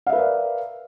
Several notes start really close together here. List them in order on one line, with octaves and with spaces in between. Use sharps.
F5 E5 B4 A#4 D5